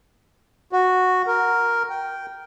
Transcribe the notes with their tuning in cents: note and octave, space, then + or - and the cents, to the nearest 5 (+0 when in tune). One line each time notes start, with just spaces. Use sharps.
F#4 -5
A#4 +0
G5 -10